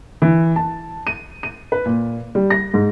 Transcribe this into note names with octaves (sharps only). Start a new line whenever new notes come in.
E3
A5
D#7
D#7
B4
A#2
G3
A#6
G#2